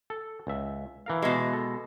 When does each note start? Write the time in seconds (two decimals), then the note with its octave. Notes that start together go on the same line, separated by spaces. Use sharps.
0.10 A4
0.47 C#2 E5
1.06 E3 A#4 F5
1.22 B2 G#3
1.53 A4